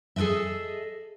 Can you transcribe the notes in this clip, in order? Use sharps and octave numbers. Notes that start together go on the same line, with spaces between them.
G#4 A4 B4 D#5 E5